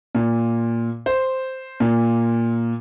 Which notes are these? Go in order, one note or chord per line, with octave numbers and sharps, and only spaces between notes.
A#2
C5
A#2